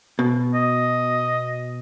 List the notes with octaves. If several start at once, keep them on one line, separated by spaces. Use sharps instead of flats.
B2
D#5